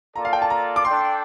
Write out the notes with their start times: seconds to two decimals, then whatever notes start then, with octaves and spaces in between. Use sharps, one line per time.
0.15 A#3 F4 A4 D5 A#5
0.25 F5
0.33 G5
0.42 A5
0.50 A#5
0.76 D6
0.85 D4 A4 D5 G5 C6